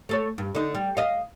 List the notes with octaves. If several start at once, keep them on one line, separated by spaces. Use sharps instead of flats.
A3 A4 C#5
G2
D3 D#4
G3
D#5 F5